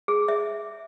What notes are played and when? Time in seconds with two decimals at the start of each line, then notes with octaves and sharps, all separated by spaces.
0.08 G#4
0.28 E5